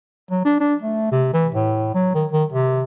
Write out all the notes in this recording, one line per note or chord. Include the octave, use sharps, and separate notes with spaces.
F#3
D4
D4
A3
C3
E3
A2
F#3
D#3
D#3
C3